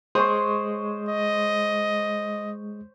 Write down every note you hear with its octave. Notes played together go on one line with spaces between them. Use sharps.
G#3 C5 C#5 C6 D#6
D#5